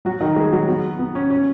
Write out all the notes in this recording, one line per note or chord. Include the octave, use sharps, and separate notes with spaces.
F#3 F#4
D#3 D#4
G#3 G#4
F#3 F#4
B3
B3
C#4
C#4